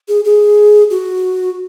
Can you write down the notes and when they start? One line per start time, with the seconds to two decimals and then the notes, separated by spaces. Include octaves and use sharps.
0.08 G#4
0.25 G#4
0.91 F#4